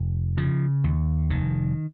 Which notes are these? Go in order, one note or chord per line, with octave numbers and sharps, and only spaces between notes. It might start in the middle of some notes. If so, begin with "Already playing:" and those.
Already playing: F1
C#3 F3
D#2
F1 D#3